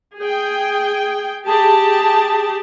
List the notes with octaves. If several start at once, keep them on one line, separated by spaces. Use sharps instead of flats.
G#4 G5
G4 G#4 A5